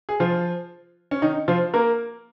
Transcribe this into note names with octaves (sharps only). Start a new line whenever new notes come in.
G#4
F3 F4
C#4
D#3 D#4
F3 F4
A#3 A#4